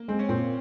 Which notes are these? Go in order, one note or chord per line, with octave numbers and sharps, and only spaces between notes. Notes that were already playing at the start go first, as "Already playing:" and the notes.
Already playing: A#3
G#3 C4
C#4
A#2 C4